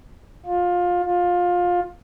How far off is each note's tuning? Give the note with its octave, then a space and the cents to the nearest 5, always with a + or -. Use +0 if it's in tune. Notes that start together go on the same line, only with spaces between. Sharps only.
F4 +20
F4 +20